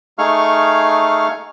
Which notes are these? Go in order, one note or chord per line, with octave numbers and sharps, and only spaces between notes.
A3 D#4 G#4 F5 C#6 F6